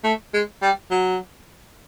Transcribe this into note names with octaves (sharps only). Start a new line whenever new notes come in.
A3
G#3
G3
F#3